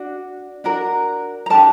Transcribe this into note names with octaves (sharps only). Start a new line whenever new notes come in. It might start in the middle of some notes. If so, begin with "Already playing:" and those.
Already playing: D4 F#4
D4 F#4 A#4
A#5
D4 G4 A#4 A5